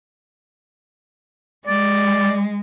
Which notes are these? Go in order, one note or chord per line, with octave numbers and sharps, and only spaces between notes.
G#3 D5